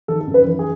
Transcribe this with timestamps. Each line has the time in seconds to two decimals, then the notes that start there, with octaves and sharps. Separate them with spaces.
0.08 D#3 A4
0.21 A4
0.27 F#2
0.34 B4
0.46 E3
0.59 G#4